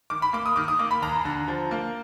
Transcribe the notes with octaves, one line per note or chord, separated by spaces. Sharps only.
D#3 D6
B5
A#3 D6
D#6
D#3 D6
D#6
A#3 D6
B5
D#2 A#5
D3
F3
A#3